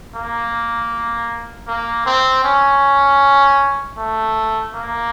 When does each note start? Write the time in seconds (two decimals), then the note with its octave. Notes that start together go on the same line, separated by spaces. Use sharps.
0.15 A#3
1.67 A#3
2.06 C4
2.44 C#4
3.97 A3
4.74 A#3